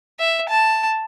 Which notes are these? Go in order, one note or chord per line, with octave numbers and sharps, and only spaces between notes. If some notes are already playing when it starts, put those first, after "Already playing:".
E5
A5